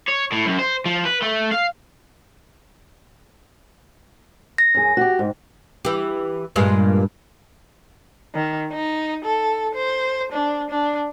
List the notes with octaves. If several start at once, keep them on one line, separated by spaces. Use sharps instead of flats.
C#5
A2
F#2
C5
F3
B4
A3
F5
A#6
F#2 G#4
F#4 G4
G#2
E3 G4
G2 A#2 G#3
D#3
D#4
A4
C5
D4
D4